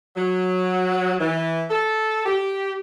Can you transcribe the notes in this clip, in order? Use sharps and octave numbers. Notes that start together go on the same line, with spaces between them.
F#3
E3
A4
G4